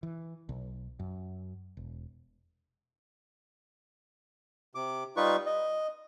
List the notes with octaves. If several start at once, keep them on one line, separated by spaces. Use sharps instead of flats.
E3
B1
F#2
E1
C3 D6
G3 D#4 F4 B4 C#6
D#5